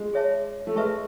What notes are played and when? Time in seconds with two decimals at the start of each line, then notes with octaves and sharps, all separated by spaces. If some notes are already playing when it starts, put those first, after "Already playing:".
Already playing: G#3
0.13 G#4 C#5 E5 A5
0.67 A3
0.76 G#3 B4 E5 A5 C#6